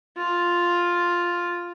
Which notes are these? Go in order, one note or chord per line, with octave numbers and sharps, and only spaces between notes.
F4